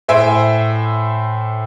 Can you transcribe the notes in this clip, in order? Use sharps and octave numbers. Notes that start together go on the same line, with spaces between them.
A2 C5 E5 G#5 D7